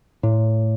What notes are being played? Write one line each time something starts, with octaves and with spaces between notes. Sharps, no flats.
A2